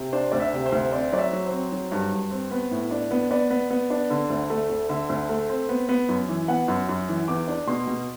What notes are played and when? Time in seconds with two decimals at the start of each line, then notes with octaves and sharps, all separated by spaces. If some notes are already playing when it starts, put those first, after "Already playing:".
Already playing: C3
0.13 D4 C5
0.32 D2 D5
0.40 E5
0.53 C3
0.66 C5
0.72 D2
0.92 C4 D5
1.12 F#3 D5
1.19 E5
1.32 F#3
1.46 C5
1.52 C4
1.72 F#3
1.92 G2
2.12 G2
2.31 C4
2.51 B3
2.71 A2
2.91 D4
3.11 B3
3.31 B3 D5
3.50 B3
3.70 B3
3.90 D4
4.10 D3
4.30 D2
4.50 A3
4.69 D2
4.89 D3 E5
5.09 D2
5.29 A3
5.49 C4
5.69 B3
5.89 B3
6.09 F#2
6.29 E3
6.48 B3 F#5
6.68 F#2
6.89 F#2
7.09 E3
7.28 E2 D6
7.48 D4
7.67 B2 C6
7.87 B2